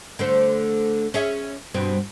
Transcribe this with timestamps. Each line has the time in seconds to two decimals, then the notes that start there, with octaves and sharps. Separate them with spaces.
0.19 D3 A3 C5
1.14 C#4 G#4 E5
1.74 G2 B2 C4